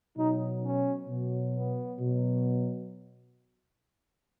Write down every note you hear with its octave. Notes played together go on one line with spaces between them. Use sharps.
B2 F#3 D#4
C#4
B2 F#3
B3
B2 F#3